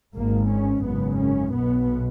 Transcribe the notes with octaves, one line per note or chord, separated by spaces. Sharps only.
G#1 G#2 A#3
C#4
G#1 F#2 C#3 B3
C#4
B1 B2 B3